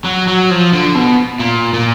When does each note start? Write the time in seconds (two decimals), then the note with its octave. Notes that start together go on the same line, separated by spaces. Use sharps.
0.04 F#3
0.27 F#3
0.50 F3
0.73 D3
0.95 B2
1.40 A#2
1.73 A#2